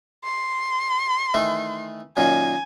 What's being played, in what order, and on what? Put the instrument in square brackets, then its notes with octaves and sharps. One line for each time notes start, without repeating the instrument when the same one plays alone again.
[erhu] C6
[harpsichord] D#3 E3 A3
[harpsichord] F#2 A#2 D#3 [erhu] G#5